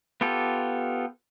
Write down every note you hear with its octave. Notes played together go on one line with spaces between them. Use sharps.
B3 F4 G4 A4